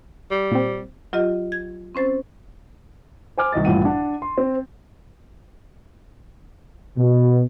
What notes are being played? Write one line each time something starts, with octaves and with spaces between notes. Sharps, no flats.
G3
A#2 C4
F#3 F4 G4 D#5
G#6
C4 C#4 C5 A6
C5 G#5 D6 F6
C2 D#3 D#5 A6
A1 G2 A#2 E3 F#5 D#7
D4 F#5 A5
C6
C4
B2